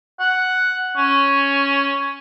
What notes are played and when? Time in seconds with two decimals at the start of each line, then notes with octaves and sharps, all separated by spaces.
0.20 F#5
0.97 C#4